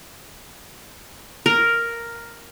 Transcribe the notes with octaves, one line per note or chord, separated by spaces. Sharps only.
A#4